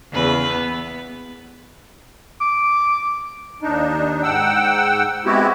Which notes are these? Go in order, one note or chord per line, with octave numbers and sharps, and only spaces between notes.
E2 C#3 B4
B3
D6
D#2 D4 D#4
G#2 F#5 G5 E6
G#3 B3 C4 E4 F#4 G4